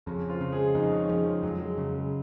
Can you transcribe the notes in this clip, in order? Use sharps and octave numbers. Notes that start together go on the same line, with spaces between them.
F2 C#3 C#4
F3 F4
C#3
G#3 G#4
F2 D#3 D#4
C#3 C#4
C#3 F3 C#4
G#3
F2 F#3
G#3
C#3
G#3